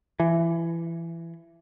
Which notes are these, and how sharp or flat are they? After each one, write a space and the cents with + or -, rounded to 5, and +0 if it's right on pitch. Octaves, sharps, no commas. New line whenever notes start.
E3 +20